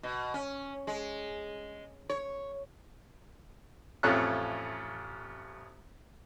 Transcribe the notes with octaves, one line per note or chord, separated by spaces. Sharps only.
B2
C#4
G#3
C#5
A1 F2 A3 C#4 F4 F#6